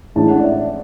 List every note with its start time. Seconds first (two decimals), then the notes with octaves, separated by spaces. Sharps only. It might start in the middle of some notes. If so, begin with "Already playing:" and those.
0.16 A1 A2 G#3 D4 A5
0.29 F#5
0.39 D5
0.44 E5
0.57 D5